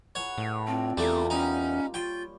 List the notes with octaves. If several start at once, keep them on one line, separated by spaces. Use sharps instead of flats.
G#4 B4 C#5 F#5
A2
C4 D4 F4 A5
E2 A#2 G3 A3
G3 C#4 D#4
F4 C#5 G5